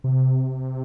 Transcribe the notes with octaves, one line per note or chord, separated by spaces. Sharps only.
C3